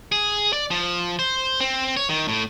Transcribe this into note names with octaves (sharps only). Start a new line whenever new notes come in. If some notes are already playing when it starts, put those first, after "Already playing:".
G#4
D5
F3
C5
C4
C#5
D#3
A2